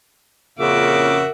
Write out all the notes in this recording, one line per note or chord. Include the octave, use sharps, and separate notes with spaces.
F2 A#2 C#3 F#4 A#4 E5 D6